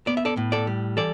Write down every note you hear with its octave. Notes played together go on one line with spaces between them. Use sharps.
B3 D5
E5
A4 D5
A2
A4 D5
G3
E3 A4 D5